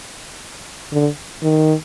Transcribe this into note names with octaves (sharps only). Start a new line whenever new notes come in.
D3
D#3